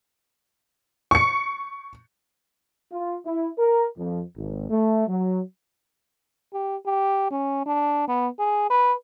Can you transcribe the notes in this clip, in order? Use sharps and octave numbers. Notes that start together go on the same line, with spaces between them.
C#6 C#7
F4
E4
A#4
F2
G#1
A3
F#3
G4
G4
C#4
D4
B3
G#4
B4